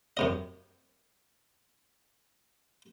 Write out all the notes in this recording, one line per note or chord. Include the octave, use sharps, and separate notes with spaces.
F#2 C3 D#5